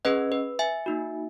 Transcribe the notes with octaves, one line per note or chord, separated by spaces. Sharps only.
C#4 G#4 B4 D#5
B4
E5 G#5
A#3 D#4 F#4